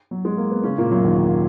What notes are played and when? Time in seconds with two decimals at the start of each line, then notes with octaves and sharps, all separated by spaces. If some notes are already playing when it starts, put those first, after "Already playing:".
0.11 F#3
0.25 G#3
0.37 A#3
0.51 B3
0.63 C#3 C#4
0.78 A#2 A#3
0.91 F#2 F#3
1.05 D#2 D#3